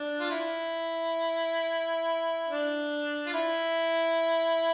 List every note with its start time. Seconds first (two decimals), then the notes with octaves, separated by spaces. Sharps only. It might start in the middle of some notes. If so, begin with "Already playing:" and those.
Already playing: D4
0.20 F4
0.30 E4
2.48 D4
3.27 F4
3.34 E4